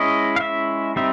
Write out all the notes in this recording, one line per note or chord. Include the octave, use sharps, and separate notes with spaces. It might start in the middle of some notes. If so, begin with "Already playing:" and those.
Already playing: G#3 C#4 E4 D#5
F5
E5
G3 C4 D#4 E5